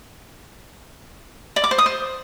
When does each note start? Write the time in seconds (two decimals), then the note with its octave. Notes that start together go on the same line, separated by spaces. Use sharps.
1.56 D5
1.64 D6
1.71 C5
1.78 D#6
1.86 C5